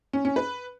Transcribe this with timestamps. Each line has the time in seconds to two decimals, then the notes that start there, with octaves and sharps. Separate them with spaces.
0.13 C#4
0.25 C#4
0.36 B4